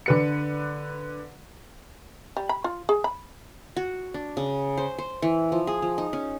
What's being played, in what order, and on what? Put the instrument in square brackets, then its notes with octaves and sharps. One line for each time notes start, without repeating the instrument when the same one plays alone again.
[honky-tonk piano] D3 B4 C#7
[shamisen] G3
B5
F4
G#4
B5
[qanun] F#4
D4
C#3
C5
C5
E3
F3
G#4
F3
D#4
C#4